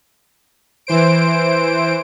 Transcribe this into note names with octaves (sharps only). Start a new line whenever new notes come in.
E3 C5 D7